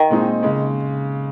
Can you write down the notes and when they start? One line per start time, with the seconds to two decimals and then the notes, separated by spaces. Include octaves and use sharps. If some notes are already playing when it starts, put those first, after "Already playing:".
Already playing: D#3
0.10 A#2 G#3 C4 D#4
0.43 C#3 G#3